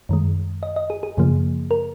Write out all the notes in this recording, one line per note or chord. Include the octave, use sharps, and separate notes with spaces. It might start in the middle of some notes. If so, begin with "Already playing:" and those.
F#2 D#3 G#3
D#5
D#5
G#4
G#4
F#2 C#3 F3 A#3
A#4